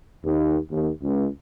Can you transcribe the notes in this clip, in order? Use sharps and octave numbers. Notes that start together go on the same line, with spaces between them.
D#2
D#2
C#2